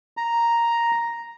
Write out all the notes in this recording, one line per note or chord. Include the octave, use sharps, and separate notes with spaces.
A#5